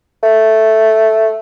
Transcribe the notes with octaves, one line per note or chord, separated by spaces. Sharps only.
A3